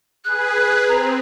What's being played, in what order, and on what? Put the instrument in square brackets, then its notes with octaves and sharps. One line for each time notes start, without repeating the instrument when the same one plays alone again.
[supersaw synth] G#4 B4 [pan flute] F#6
[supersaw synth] C4 [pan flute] A#5